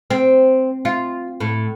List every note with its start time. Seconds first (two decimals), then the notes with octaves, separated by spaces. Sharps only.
0.10 C4
0.85 F4
1.40 A2